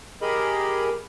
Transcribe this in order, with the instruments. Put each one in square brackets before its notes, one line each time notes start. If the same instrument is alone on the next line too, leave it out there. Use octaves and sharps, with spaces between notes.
[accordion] G4 G#4 A#4 D#5 B5